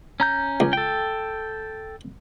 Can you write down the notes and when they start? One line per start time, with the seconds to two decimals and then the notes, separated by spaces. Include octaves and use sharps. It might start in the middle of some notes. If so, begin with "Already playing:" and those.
0.20 C#4 A#5 G6
0.60 C#2
0.73 A4 G5